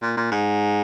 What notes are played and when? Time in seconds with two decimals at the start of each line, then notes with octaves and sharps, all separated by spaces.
0.02 A#2
0.17 A#2
0.31 G#2